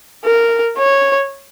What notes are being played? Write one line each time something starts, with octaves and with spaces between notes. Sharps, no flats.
A#4
C#5